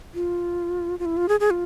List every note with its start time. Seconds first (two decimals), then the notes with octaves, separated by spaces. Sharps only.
0.14 F4
0.99 F4
1.05 E4
1.17 F4
1.29 G#4
1.40 G#4
1.51 F4